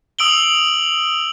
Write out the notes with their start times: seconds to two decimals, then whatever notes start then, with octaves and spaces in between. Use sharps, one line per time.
0.19 D#6 E6 D7 F#7 G7